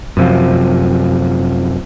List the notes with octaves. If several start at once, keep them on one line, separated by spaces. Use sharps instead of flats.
F#2 C3 F3